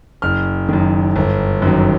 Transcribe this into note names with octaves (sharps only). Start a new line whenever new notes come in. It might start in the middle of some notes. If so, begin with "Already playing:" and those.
F#1 F6
F#2 D#3
G1
F#2 D#3 F#3